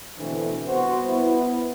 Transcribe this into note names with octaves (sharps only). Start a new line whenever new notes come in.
B2 D3 E3 A3 C4 D4
C2 B3 F#4 C5
B3 E4